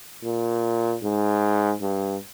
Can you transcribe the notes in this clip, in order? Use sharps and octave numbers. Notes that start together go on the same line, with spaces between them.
A#2
G#2
G2